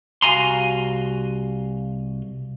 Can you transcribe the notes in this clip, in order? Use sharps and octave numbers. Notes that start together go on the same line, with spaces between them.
C2 F#4 F5 G#5 A#5 C6